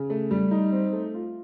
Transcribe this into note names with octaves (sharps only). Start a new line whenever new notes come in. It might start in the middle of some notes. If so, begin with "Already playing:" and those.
Already playing: C#3
A3
G3
D#4
C4
A3
F4